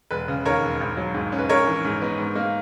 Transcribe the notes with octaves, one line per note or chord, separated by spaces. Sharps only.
E1 B4
C#3
D#2 A#4 C#5
E1
G#1
F#3
G#2
C#4
B4
A#1 A#4 C#5
E3
G#2
B3
G#2
A#3